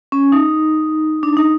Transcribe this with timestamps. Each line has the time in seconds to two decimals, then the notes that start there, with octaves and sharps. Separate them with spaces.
0.12 C#4
0.32 D#4
1.23 D4
1.37 D#4